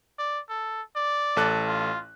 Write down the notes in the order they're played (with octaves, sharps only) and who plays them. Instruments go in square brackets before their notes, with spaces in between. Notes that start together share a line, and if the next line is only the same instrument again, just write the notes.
[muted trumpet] D5
A4
D5
[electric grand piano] A1 A4 F#6
[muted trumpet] F4